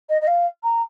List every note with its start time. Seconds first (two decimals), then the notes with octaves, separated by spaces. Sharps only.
0.09 D#5
0.21 D#5
0.27 F5
0.63 A#5